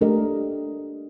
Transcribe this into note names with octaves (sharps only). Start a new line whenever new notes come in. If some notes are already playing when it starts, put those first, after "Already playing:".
A3 D4 G4 A#4 D#5